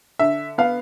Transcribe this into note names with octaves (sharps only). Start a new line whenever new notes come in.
D3 E5
B3 F5